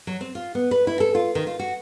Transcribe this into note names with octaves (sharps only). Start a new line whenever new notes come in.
F#3
C4
F4
B3
B4
E4
A4
F4
D#3
F4
F#4